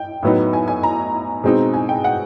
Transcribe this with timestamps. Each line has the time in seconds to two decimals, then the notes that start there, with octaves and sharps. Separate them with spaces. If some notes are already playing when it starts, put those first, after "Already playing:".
Already playing: G5
0.23 A2 F#3 B3 D#4
0.53 G#5
0.68 G#5
0.83 A#5
1.44 B2 G#3 C4 D#4
1.74 G#5
1.89 G5
2.04 F#5